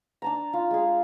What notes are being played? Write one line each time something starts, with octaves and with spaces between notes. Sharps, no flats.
D4 A5 A#5
F4
G#3 G#4